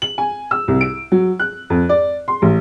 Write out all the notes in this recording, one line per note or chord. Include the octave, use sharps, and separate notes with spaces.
F#7
G#5
E6
C2
D7
F#3
F#6
F2
D5
C6
A1